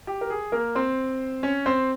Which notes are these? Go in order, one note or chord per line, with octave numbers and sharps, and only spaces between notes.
G4
A#4
G#4
A#3 A#4
C4 C5
C#4 C#5
C4 C5